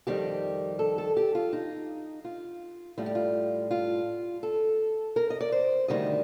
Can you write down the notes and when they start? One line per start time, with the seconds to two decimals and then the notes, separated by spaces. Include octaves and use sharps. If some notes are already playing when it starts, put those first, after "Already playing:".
0.07 F2 D#3 G3 G4
0.79 A4
0.98 A4
1.17 G4
1.35 F4
1.53 D#4
2.25 F4
2.98 A2 G3 F4
3.06 G4
3.15 F4
3.71 F4
4.43 A4
5.16 A#4
5.30 D#5
5.41 D5
5.52 C5
5.88 D2 C3 D#3 G3 D#5